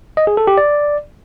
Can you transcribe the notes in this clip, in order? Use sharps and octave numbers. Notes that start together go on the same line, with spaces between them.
D#5
G#4
A4
G4
D5